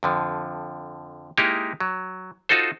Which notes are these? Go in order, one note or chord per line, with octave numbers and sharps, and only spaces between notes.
F2 D3 F3
G#3 A#3 D#4 E4 G4 A#4
F#3
D#4 F4 F#4 A4 C5